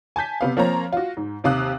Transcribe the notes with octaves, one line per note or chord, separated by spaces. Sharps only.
G#5 A5 G6 B6
C3 B3 F5
F3 A#3 C4 C#5 A#5
F4 F#4
G#2
D#2 C3 F5 D#6 F#6